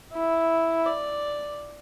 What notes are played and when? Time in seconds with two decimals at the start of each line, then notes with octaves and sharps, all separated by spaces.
0.14 E4
0.86 D5